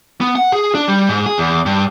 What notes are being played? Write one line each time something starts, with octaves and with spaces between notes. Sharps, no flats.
B3
F#5
G#4
D4
G3
G#2
G#4
E2
G2